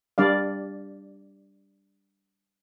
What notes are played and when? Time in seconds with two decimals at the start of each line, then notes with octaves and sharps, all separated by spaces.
0.18 G3 D4 D5 F5